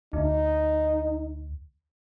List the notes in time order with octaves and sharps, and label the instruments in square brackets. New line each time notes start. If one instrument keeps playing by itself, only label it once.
[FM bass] D2 [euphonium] D#4